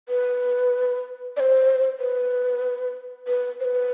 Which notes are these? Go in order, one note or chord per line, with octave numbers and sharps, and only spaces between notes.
B4
D5
C5
B4
B4
C5
B4